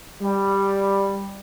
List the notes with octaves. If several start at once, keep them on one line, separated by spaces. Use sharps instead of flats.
G3